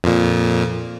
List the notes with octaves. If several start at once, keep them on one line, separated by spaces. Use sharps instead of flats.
F2 A#2